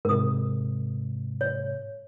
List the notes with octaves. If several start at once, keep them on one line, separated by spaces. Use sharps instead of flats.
G#2 C3 A#4 D#6
C#5